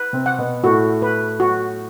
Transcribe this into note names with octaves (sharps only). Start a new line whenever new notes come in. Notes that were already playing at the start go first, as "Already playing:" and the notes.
Already playing: B4
C3 C4
F#5
B2 B3
A2 A3 F#4
B4
F#4